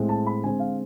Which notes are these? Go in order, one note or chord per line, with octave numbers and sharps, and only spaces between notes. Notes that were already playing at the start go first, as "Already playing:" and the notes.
Already playing: A2 G#3 C4
A5
B5
D3 G#3 C4 G#5
F5